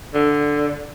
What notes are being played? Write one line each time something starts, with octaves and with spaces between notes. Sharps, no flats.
D3